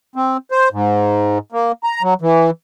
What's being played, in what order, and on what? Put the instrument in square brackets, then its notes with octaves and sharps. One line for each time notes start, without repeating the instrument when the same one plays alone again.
[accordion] C4
C5
G#2
A#3
A#5
F#3
E3